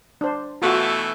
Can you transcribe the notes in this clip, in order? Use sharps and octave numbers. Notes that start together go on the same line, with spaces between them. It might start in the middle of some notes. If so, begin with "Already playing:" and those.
D4 C5
B2 E3 A3 F4 F#4